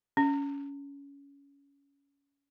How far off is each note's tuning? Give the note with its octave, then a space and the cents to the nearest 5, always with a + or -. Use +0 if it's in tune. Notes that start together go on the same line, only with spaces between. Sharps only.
C#4 +20